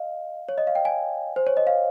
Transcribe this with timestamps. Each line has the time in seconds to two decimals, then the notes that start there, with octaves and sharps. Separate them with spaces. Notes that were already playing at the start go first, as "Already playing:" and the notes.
Already playing: D#5 F5
0.49 C#5
0.58 D#5
0.67 F5
0.75 G5
0.85 G#5
1.36 C5
1.47 C#5
1.57 D#5
1.67 F5